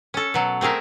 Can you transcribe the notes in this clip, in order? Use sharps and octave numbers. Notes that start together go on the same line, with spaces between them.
C#4 A4
B2 F#3
A3 C4 G#4 A#4 E5